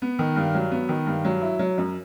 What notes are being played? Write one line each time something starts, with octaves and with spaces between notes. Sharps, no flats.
B3
D#3
G2
F#3
B3
D#3
G2
F#3
E4
F#3
F#2